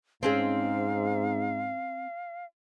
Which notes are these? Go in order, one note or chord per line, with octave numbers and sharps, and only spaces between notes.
G#2 C4 C#4 G#4 F5